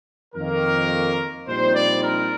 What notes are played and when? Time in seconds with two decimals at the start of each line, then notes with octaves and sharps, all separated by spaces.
0.35 F2 D#3 A#3 A#4
1.47 A#1 A#2 G3 C4 D#4 C5
1.75 D5
2.04 A#4